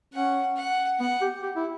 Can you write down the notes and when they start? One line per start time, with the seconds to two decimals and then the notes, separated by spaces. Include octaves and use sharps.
0.14 C#4 F#5
0.56 F#5
1.00 B3 F#5
1.21 G4
1.42 G4
1.56 E4